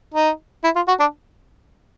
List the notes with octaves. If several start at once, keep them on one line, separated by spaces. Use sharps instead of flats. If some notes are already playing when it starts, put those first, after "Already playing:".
D#4
E4
F4
F#4
D4